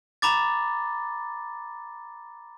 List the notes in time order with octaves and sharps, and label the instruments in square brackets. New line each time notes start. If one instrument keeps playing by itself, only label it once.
[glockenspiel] A#5 B5 D6 A6